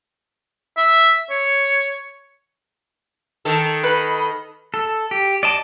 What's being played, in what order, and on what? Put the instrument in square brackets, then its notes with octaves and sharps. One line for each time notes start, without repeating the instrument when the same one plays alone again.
[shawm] E5
C#5
[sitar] D#3 A4
[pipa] B4 [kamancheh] D#5 B5
[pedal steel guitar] A4
G4
D5 D#5 A5